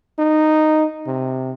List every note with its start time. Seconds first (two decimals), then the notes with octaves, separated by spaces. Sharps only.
0.19 D#4
1.07 C3